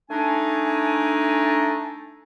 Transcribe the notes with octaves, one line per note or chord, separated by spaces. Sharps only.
A3 D4 D#4 G#5